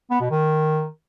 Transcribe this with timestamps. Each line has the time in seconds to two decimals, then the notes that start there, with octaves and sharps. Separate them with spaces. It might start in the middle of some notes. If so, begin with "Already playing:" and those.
0.10 B3
0.20 B2
0.30 D#3